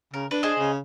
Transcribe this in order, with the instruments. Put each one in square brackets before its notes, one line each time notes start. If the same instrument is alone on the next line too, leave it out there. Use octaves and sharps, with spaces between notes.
[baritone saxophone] C#3 [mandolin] A#4
[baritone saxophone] D4 [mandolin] B4
[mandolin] G#4 C5 D#5
[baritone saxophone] C#3